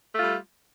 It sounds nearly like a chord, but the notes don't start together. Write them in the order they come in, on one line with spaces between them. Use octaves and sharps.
A3 F4 G3